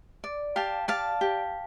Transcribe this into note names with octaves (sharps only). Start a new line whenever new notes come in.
D5
G4 F5 A5
D5 F5 A5
G4